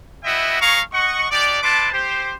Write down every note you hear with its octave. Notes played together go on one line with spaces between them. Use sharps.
B3 E4 F#4 D#5 E5 G5
G#4 C#5 F5 A#5 C#6
D#5 F#5 C#6
D4 D#4 G4 D5
D4 E4 B4 A5 C6 D6
G4 C5